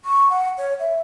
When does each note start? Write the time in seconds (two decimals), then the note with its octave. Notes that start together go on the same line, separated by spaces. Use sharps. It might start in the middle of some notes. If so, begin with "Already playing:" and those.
0.05 C#6
0.30 F#5
0.58 C#5
0.79 E5